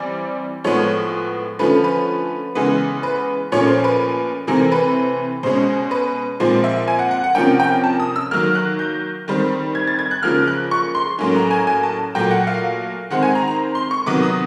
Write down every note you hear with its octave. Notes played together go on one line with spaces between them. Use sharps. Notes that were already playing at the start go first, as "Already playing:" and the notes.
Already playing: E3 G3 C4 D5
A2 F3 G#3 B3 C#5
D3 F3 A3 C#4 B4
B4
C#3 E3 G#3 B3
B4
A#2 F3 A3 C#4 C#5
C5
B4
C3 E3 A3 C4 A#4
B4
B2 G#3 C#4 C5
B4
A#2 F3 G#3 C4 C5
E5
G#5
F#5
F#5
F#5
C3 F3 A#3 C#4 G5
G5
A5
D#6
E6
D#3 F#3 A#3 F6
F#6
G6
D#3 G3 C4
G#6
A6
G#6
F#6
C#3 F3 A#3 F6
F#6
C#6
C6
A2 F#3 A#3 C#4
A#5
G#5
G#5
A5
A#2 F#3 A3 G5
F#5
F5
D#3 G#3 C4 F#5
G#5
A#5
A#5
C6
C#6
C3 D#3 F#3 B3 D6
D#6